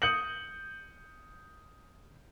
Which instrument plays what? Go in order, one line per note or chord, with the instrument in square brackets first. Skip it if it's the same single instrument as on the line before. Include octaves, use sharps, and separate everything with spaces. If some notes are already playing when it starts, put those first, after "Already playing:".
[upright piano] D#6 G6 C#7 F#7